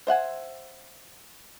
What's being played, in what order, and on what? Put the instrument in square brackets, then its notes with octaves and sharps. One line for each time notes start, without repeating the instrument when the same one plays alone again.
[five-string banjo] C5 E5 F#5 G#5